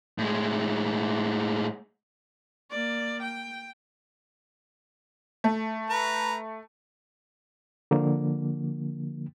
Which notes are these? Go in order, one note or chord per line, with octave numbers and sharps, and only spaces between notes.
A2 G#3
A#3 D5
G5
A3
B4 A#5
D3 F3 A#3